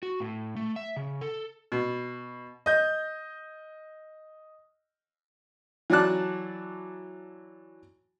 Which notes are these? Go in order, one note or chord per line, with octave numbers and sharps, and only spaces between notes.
F#4
A2
A3
E5
C#3
A4
B2
D#5 G6
E3 F#3 F#4 D5 A5 F#6